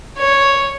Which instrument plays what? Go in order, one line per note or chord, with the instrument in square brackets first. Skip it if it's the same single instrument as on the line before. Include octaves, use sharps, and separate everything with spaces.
[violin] C#5